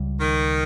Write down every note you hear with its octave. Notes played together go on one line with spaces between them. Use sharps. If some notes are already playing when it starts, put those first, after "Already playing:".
Already playing: C#2 C#3 G3
D#3